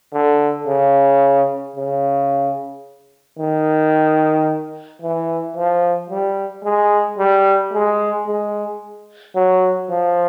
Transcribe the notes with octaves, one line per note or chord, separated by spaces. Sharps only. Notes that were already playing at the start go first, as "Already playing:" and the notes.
D3
C#3
C#3
D#3
E3
F3
G3
G#3
G3
G#3
G#3
F#3
F3